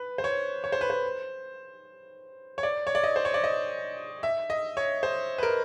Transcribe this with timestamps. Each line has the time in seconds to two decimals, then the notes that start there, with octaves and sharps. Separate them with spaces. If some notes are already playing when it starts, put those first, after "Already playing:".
Already playing: B4
0.18 C5
0.24 C#5
0.64 C#5
0.72 C5
0.81 B4
0.90 C5
2.58 C#5
2.63 D5
2.87 C#5
2.95 D5
3.03 D#5
3.16 C5
3.25 C#5
3.34 D5
3.44 D#5
4.23 E5
4.50 D#5
4.77 C#5
5.03 C5
5.38 B4
5.43 A#4